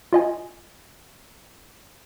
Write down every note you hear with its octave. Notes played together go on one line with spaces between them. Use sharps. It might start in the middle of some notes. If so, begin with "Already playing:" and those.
F4 D#5 G#5